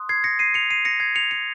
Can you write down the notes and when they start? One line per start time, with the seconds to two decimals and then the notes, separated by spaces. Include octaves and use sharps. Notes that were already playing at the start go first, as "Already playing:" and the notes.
Already playing: C6 D#6 F#6
0.09 G#6 C7
0.24 A#6 C#7
0.39 C7 D#7
0.54 C#7 F7
0.71 C7 D#7
0.85 A#6 C#7
1.00 G#6 C7
1.16 C#7 F7
1.31 C#7 F7